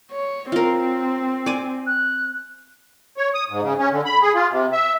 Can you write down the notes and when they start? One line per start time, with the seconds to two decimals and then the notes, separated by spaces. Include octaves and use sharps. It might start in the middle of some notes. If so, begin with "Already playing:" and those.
0.11 C#5
0.52 C4 F4 A#4
1.46 D5 G#5
1.87 F#6
3.17 C#5
3.35 D#6
3.50 G#2
3.63 C#3
3.79 C#4
3.92 D3
4.05 B5
4.22 G#4
4.35 F4
4.50 C3
4.73 E5